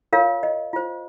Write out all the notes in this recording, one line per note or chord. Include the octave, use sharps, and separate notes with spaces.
F4 A#4 C#5 F5
D#5
F4 C5